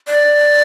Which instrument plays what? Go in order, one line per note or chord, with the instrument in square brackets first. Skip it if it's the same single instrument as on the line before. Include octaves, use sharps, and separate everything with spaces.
[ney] D5